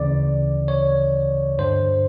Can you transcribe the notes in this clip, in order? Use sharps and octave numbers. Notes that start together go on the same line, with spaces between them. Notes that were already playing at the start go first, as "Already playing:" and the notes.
Already playing: D2 C#3 E3 D5
C#5
G2 D3 C5